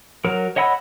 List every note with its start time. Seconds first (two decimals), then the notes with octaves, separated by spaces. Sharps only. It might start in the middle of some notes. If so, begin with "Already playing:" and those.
0.24 F#3 A#4
0.56 C#5 D#5 F#5 B5 E6